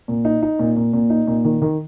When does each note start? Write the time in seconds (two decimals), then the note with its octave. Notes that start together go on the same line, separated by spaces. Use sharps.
0.08 A#2
0.25 D#4
0.42 D#4
0.59 A#2
0.76 A#2
0.93 A#2
1.10 D#4
1.27 A#2
1.45 D#3
1.62 D#3